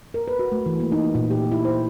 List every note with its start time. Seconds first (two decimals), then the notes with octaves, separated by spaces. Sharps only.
0.14 A#4
0.28 B4
0.39 F#4
0.52 A3
0.66 E3
0.80 A#3
0.92 D#4
1.15 A#2
1.31 G4
1.52 E4
1.65 C5